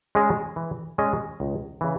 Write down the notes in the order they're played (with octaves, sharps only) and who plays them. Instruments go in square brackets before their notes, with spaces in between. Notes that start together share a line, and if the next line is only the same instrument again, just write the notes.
[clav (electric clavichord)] G#3 C#4 G#4 D#5
E3
G#3 C#4 G#4 D#5
C#2
C#3 E3